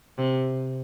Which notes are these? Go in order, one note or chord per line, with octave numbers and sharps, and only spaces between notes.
C3